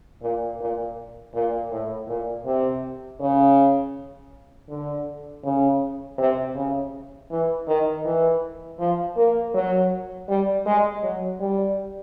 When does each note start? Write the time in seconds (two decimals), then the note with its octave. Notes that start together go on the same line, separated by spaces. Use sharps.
0.22 A#2
0.60 A#2
1.34 A#2
1.71 A2
2.08 A#2
2.46 C3
3.20 C#3
4.69 D3
5.44 C#3
6.18 C3
6.55 C#3
7.30 E3
7.67 D#3
8.05 E3
8.79 F3
9.16 A#3
9.54 F#3
10.28 G3
10.66 G#3
11.03 F#3
11.40 G3